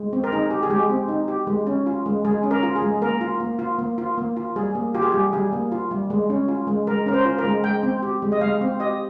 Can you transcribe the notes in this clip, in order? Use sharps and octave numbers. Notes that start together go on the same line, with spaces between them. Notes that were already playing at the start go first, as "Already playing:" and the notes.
Already playing: G#3
C4
A#4
D#4 G#4
G4
G#4
G#3 G4
C4
D#4
G4
G#3
C#4
F4
G#3
G#3 G#4
C#4
A#4
F4
G#4
G#3
A#3 A#4
F4
A#3
F4
A#3
F4
A#3
F4
G3 G#4
A#3
F4 G4
G#4
G3 G4
G3 G#4
A#3
F4
G3
G#3
C#4
F4
G#3
G#3 A#4
C#4 A#4
C5
F4
A#4
G#3
G#3 G5
C4
G4
G#3
D#5
G#3 F5
C4
G4 D#5